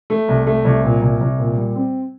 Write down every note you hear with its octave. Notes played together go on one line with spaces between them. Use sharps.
A3
C2
A3
C2
A#2
C2
C2
A#2
G3
C4